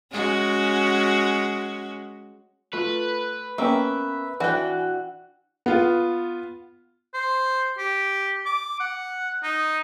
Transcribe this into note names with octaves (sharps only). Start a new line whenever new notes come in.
G#3 C#4 F#4
A3 F4 B4
A#3 B3 C#4 E5 G5
E3 D4 F#4 E5 G5 G#5 F#6
B3 F4
C5
G4
D6
F#5
D#4